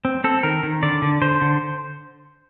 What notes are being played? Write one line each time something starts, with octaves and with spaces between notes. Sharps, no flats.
C4
C4 A4
D#3 A#4
D#3
D3 D5
D3
D3 C5
D3